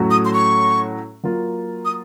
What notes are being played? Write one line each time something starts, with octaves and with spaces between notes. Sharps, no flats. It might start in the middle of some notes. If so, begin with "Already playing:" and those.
Already playing: A2 F#3 A3 C#4 F#4
D#6
C6
C#6
F#3 A#3 F4 A#4
D#6